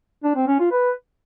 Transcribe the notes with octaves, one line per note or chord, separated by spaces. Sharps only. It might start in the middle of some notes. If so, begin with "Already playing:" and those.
D4
C4
C#4
F4
B4